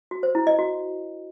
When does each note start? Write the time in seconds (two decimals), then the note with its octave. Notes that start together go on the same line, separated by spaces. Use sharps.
0.11 F#4
0.23 C5
0.35 E4
0.47 D#5
0.59 F#4